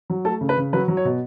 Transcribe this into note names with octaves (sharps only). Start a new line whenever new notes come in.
F#3
A3 A4
C#3
B4
C#3
F#3 B4
F#3
C#5
B2